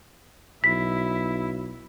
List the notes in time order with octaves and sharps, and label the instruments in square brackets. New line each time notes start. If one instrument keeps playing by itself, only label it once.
[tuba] B1 [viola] E4 [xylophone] B6